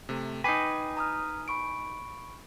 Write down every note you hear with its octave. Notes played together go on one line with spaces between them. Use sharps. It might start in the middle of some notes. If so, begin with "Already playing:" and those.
C3 A3
D#4 B4 G5 G#5 D6 C7
A#5 D#6 F6
B5 C#6 D7